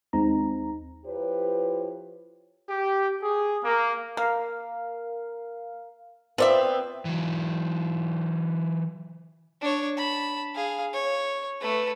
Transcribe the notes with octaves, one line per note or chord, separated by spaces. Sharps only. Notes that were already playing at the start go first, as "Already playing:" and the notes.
D#2 G#3 C4 D#4 A#5
F3 E4 F4 G4 B4 C#5
G4
G#4
A#3
A#3 A#4 F5
B3 C4 F4 D5 E5
E3 F#3
D4 C#5
A5 B5
G#4 F5
C#5
A3 B4